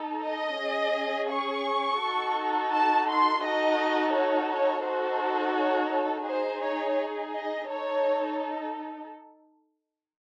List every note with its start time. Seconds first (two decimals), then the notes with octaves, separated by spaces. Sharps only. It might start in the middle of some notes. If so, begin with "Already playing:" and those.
Already playing: D#4 A4
0.26 D#5
0.60 C#4 G#4
1.32 C#6
2.03 D#4 F#4 A4
2.73 A5
3.09 C6
3.45 D#4 F#4 A4 D#5
4.14 C#5
4.51 C#5
4.86 D#4 F#4 A4 C5
5.57 C#5
5.91 A4
6.28 D#4 G#4 C5
6.63 C#5
7.34 D#5
7.70 D#4 A4 C#5